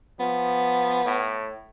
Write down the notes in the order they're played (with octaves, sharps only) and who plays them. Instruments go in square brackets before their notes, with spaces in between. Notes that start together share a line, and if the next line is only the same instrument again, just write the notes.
[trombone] F3 [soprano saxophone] B3
[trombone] A2